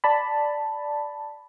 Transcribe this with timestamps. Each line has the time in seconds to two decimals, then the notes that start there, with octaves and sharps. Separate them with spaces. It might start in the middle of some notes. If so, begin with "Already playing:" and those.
0.04 D5 A5 B5